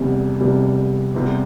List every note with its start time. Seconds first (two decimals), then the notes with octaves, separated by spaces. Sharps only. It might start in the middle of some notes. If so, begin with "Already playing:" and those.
Already playing: F1 E2 C3 G3
0.41 F1 E2 C3 G3
1.14 E2 C3 G3